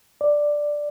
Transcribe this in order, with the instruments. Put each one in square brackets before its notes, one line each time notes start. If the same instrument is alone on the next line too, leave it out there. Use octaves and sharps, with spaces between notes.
[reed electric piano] D5